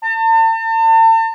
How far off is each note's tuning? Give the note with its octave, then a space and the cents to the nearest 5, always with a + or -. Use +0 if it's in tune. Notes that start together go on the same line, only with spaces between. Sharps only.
A5 +40